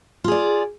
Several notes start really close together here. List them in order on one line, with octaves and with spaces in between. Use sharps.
F4 G#4 D5